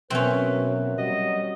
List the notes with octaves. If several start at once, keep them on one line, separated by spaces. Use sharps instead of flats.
B2 F#3 C4 C#4 A#4 B4 E5
F#3 G3 D#5 F#5